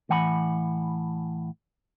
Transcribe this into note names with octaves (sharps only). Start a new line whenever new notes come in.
A2 E3 F#5 G#5 A5 B5